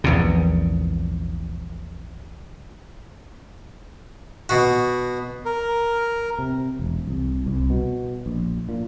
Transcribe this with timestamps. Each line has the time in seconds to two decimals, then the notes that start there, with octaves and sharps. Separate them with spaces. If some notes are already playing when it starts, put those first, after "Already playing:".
0.04 A#1 E2 G#2 C3
4.49 B2 F#4
5.45 A#4
6.39 C3
6.79 E1
7.07 C2
7.46 C2
7.70 B2
8.26 A#1
8.69 A#2